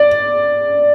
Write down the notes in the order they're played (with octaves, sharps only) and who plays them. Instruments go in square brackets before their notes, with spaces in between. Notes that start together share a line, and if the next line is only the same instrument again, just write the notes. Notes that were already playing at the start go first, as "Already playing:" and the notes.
Already playing: [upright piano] D5